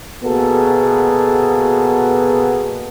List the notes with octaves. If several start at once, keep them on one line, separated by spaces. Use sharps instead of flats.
B2 A#3 B3 F#4 G#4 A4